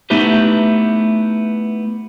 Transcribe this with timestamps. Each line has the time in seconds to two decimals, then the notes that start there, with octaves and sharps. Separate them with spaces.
0.10 A3 B3 D#4 E4 G4 B4